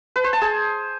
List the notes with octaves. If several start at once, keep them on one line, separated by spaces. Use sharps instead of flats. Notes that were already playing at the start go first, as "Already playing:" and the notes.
B4
C5
A5
G#4